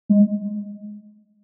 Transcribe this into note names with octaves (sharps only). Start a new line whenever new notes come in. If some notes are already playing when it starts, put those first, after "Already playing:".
G#3